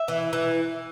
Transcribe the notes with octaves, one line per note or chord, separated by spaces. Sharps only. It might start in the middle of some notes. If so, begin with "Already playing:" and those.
Already playing: E5
E3
E3